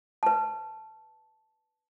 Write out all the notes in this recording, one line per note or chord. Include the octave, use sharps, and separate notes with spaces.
B4 A5